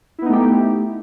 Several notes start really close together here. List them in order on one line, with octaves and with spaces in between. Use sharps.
E4 B3 D#4 A3 G4